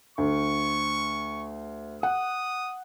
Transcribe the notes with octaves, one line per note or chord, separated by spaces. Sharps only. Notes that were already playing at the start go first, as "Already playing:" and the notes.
D2 C#6
F#5 D#6